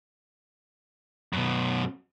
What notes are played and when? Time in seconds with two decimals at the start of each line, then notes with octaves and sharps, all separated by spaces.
1.33 F#2 B2